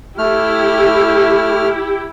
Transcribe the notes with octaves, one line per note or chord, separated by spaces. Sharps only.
A3 E4 G4 F6